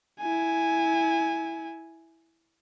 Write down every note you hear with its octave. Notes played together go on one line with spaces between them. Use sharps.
E4 G#5